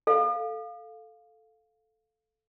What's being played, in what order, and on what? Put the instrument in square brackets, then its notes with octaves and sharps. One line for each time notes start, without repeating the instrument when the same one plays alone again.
[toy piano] A4 F5